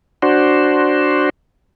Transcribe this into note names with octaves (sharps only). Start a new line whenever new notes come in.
D4 F#4 C5